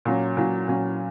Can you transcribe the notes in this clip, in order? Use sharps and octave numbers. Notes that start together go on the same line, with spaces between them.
A#2 F#3 C#4
A#2 F#3 C#4
A#2 F#3 C#4